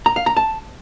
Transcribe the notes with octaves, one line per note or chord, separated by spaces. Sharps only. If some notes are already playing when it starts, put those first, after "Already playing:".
A#5
F5
A#5
A5